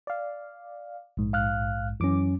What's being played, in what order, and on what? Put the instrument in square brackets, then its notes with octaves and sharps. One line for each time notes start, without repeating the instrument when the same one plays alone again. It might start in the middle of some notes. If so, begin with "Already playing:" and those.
[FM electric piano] D5 F5
A#1 G#2
[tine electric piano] F5 F6 F#6
[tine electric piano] F#2 F#3 C#4 [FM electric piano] E3 D6